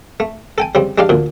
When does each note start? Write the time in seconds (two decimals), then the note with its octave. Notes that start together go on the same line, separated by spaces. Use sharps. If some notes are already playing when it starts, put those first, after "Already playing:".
0.20 A3
0.58 A4 G5 G#5
0.75 C#3 G3 C4
0.98 G#3 D4 G4 D5 F5
1.09 D2 A#2